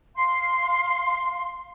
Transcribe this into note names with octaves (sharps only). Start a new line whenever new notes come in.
F5 C6